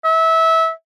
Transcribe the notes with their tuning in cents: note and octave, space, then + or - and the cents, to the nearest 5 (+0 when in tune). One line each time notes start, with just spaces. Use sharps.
E5 -20